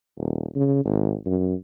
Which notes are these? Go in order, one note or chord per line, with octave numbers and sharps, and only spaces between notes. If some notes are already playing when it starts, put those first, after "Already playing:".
D#1
C#3
G#1
F#2